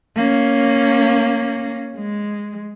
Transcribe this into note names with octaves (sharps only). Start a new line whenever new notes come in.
A#3 C#4
G#3